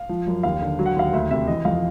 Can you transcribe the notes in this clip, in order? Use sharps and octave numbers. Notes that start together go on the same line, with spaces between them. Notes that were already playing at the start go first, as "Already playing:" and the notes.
Already playing: F5
F3
F#2
D#2 F5
D3
F#3
F#5
D#2 F5
D2 E5
C3 E5
E3 D#5
F2 F5